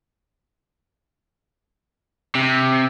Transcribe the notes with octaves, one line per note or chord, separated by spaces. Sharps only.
C3